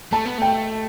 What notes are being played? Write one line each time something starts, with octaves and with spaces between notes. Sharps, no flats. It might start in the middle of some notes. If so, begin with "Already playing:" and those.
A3 A5
B3
A3 G5